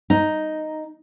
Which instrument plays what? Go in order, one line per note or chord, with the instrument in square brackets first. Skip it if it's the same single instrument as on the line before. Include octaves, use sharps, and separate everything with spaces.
[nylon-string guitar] D#4